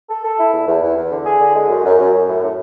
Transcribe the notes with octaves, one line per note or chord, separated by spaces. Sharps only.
A4
A4
E4
E2
E2
E2
E2
D3
G#4
D3
G#3
F#2
F#2
F#2
F#2
A2
A2